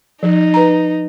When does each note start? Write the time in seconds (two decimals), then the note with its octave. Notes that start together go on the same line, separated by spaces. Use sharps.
0.23 F3 D#4
0.54 B4 A#5